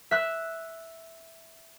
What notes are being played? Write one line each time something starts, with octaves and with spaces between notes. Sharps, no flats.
E5 F#6